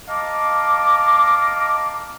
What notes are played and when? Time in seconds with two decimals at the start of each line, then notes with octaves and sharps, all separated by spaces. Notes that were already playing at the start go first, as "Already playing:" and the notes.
0.08 D#5 F5 A5 A#5 D6